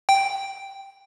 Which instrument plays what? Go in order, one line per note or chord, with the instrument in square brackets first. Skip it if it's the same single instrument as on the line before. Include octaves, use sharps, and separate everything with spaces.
[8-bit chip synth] G5